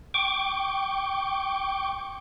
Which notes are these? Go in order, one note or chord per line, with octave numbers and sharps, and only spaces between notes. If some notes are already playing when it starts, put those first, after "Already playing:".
G5 C#6 D6